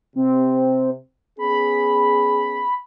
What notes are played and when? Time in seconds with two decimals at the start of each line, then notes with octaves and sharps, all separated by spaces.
0.16 C3 C4
1.39 B3 C#4 G#4 B5